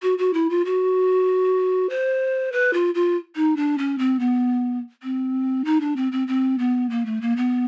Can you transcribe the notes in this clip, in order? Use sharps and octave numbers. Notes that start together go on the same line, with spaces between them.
F#4
F#4
E4
F4
F#4
C5
B4
F4
F4
D#4
D4
C#4
C4
B3
C4
D#4
D4
C4
C4
C4
B3
A#3
A3
A#3
B3